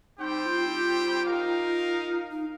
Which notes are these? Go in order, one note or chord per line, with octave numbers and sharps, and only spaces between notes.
G3 C4 D#4 G4 C5 G5
F4
D#4
F4
D#4 A#4 F5
D#4